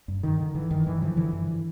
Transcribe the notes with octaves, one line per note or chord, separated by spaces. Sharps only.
G2
G2 D#3
D3
D3 E3
G2 D#3
G2 E3
D3 F3
D3 E3
G2